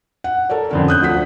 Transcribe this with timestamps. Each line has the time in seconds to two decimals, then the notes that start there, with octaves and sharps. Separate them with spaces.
0.24 F#5
0.50 A4 A#4 C#5 D5
0.71 F2 D3 C#4
0.88 D#6 F#6 G6
1.01 D2 F3 D4 F#5 B6